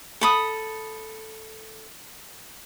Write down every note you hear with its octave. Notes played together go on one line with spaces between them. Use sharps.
A4 B5 D#6